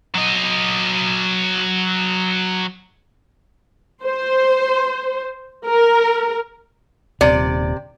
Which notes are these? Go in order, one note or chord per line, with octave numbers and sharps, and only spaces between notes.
F#3 D#5
C5
A#4
D#1 C3 D5